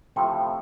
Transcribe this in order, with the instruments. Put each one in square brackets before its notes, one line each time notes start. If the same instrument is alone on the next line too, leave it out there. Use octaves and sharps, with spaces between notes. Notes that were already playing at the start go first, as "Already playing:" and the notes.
[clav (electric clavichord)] C3 F3 A3 E4 [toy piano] G5